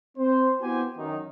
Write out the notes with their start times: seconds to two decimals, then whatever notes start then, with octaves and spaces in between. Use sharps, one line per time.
0.18 C4 C5
0.62 B3 E4 F#4 G4 C5 G#5
0.97 F#2 D#3 D#4